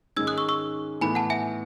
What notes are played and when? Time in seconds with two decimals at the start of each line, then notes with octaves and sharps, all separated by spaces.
0.16 G#2 D#3 G#3 C#4 E6 G#6
0.27 D#6 F#6
0.38 C#6 E6
0.49 C#6 E6
1.01 A2 E3 B3 E4 G#5 B5
1.15 F#5 A5
1.30 E5 G#5